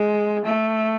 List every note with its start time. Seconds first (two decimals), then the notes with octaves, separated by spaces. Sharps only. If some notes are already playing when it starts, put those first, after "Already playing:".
Already playing: G#3
0.45 A3